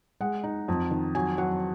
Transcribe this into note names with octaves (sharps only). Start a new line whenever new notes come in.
G#3 F#5
D#4
F2
D#3
F#3 G#5
F#3 F#5